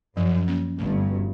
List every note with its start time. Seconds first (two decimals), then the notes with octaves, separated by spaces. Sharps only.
0.17 F#2 F3
0.48 A#3 C#4
0.78 G1 G2 A3
1.10 C#4 F#4 B4